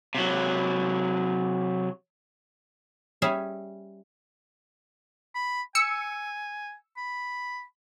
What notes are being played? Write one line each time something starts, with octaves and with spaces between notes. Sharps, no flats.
C3 F#3
G3 C#4 G#4 E5
B5
G#5 E6 C#7
B5